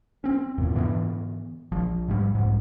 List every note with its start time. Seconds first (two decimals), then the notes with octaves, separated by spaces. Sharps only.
0.24 C4 C#4
0.58 E2 A#2
0.73 G#2 D3 E3 B3
1.72 A#1 F3
2.08 G#2 G3
2.35 B1 G#2